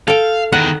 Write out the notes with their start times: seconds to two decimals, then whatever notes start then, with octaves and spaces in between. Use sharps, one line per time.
0.08 A4 F5 G5
0.52 E2 D#3 F#5